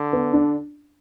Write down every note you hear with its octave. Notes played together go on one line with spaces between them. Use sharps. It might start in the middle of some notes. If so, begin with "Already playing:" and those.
Already playing: D3
B3
D4